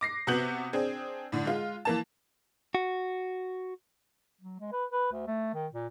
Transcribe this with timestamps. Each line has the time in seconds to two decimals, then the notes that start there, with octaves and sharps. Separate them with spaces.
0.01 D6 A#6 C7
0.27 C3 B3 F#4 G6 F#7
0.73 C4 D4 G#4
1.32 A2 D3
1.45 G#3 F4
1.85 E3 A#3 A5
2.75 F#4
4.41 F#3
4.60 G#3
4.72 B4
4.92 B4
5.12 D2
5.27 A3
5.54 D#3
5.73 A#2